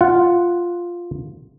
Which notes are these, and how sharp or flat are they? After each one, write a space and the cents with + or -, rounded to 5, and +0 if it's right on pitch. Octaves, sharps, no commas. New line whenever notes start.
F4 +0 F#5 +0